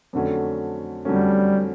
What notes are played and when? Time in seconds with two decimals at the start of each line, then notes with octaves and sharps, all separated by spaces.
0.13 F2 D3 F#3 A3 C#4
1.05 F2 D3 F#3 G3 A3 C#4